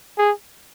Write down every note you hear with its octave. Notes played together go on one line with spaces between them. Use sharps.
G#4